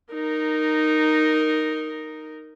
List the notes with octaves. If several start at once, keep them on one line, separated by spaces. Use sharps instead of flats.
D#4 A#4